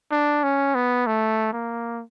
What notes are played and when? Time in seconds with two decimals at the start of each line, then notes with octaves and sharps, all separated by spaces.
0.11 D4
0.43 C#4
0.75 B3
1.06 A3
1.53 A#3